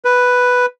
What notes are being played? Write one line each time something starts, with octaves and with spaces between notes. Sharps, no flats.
B4